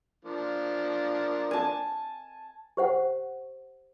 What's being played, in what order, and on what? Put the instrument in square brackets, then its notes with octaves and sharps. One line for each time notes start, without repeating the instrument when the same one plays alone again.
[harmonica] F3 A#3 D4
[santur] G#5 A5
[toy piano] G4 C5 F#5